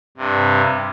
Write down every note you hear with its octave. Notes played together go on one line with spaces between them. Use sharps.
G2 C3